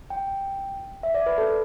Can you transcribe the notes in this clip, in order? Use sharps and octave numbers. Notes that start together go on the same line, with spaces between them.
G5
E5
D5
B4
A4